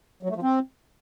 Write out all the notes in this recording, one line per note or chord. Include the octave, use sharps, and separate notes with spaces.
F#3
A3
F3
C4